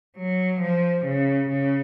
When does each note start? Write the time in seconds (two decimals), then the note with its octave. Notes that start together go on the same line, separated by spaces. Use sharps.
0.18 F#3
0.61 F3
1.05 C#3
1.49 C#3